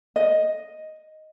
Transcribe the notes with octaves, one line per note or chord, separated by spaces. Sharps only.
D#5